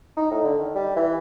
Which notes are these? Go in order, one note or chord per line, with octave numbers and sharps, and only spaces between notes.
D#4
A2
D3
D#3
G3
E3